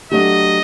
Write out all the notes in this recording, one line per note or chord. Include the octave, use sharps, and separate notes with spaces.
F#3 A3 D4 G4 D#5